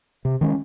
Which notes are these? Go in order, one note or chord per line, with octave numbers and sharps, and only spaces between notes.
C3
D#3 G#3 C#4